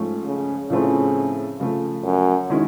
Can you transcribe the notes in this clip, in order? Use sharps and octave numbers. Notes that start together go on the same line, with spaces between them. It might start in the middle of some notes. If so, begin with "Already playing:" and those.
Already playing: G#2 F3 A3 C#4
C#3
A2 C#3 F3 A3 C4
C#3 F3 A3
F#2
D#3 G#3 C#4 E4